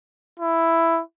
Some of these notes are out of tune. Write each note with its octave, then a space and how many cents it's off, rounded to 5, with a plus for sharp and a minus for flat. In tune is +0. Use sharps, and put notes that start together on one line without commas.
E4 +5